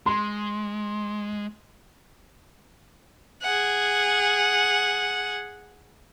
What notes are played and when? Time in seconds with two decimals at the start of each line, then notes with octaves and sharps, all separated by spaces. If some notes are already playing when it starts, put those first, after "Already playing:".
0.06 G#3 C6
3.42 G#4 F#5